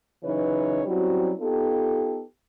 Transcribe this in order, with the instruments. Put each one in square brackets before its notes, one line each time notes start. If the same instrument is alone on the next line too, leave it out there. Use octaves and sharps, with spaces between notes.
[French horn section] C#3 E3 F#3 D#4 B4 C#5
F#3 G3 C4 C#4 E4 F#4
B3 D#4 F4 G4 A4